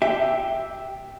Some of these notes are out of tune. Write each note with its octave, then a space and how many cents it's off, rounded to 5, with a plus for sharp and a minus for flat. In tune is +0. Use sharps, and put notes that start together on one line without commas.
G4 +0 E5 +0